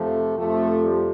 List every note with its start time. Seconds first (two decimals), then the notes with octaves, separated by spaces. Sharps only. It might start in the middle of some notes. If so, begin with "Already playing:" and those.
Already playing: F2 C3 F3 A3
0.36 F2 C3 F3 A3
0.82 G3